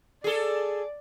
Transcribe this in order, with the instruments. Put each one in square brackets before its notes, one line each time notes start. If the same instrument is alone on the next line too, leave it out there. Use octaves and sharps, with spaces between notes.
[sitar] G#4 A4 [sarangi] D5